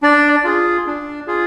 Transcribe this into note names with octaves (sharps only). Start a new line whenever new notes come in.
D4 D5
F4 G#4
D4
F4 G#4